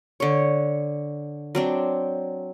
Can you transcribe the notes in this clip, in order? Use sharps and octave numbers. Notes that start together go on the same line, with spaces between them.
D3 C#5
F#3 C4 D4